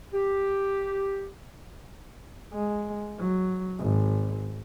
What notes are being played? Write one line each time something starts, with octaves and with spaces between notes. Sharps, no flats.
G4
G#3
F#3
G#1